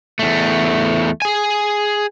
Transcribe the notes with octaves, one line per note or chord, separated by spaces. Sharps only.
E2 A3
G#4 G#5